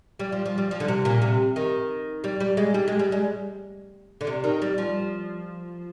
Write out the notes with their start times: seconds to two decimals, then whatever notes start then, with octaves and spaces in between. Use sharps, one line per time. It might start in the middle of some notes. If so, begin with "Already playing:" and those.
0.19 G3
0.32 F3
0.46 F3
0.58 G3
0.71 F3
0.80 D3
0.88 C3
1.05 A#2
1.22 C3
1.56 D#3
2.24 G3
2.40 G3
2.57 G#3
2.74 G3
2.88 G#3
2.99 G3
3.12 G#3
4.21 D3
4.27 C3
4.44 D#3
4.62 G3
4.78 F3